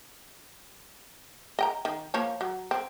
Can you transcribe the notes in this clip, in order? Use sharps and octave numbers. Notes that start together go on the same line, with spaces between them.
D#5 G5 A#5
D#3
F3 A#3 C#5
F#3
C4